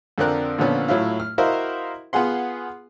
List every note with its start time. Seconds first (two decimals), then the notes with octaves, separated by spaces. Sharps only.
0.18 F2 D3 C4 D4 A#4 F#6
0.58 A#2 D3 F3 B3 C#4
0.88 A2 F#3 E4 F4
1.20 F6
1.38 E4 F#4 A#4 C5 D#5 F5
2.13 B3 F4 G#4 F#5 C6